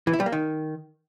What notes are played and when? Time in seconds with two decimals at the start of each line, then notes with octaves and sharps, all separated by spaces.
0.07 E3
0.13 E4
0.20 G3
0.26 A#3
0.32 D#3